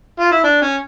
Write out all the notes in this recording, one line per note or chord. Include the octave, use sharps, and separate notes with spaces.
F4
E4
D4
C#4